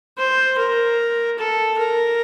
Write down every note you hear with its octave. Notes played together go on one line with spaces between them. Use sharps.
C5
A#4
A4
A#4